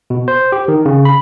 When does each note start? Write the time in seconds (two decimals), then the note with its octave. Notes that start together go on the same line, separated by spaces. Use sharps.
0.10 B2
0.28 C5
0.52 G4
0.68 D#3
0.85 C#3
1.05 B5